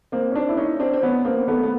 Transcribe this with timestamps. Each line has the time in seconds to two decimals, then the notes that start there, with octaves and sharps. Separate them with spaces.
0.12 A#3 C4
0.31 C#4
0.35 C4 D4
0.49 E4
0.57 C#4 D#4
0.80 C4 D4
0.93 C4
1.02 B3 C#4
1.25 A#3 C4
1.48 A3 B3
1.63 B3